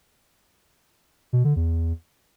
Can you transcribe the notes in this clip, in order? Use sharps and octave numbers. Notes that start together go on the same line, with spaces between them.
B2
D3
E2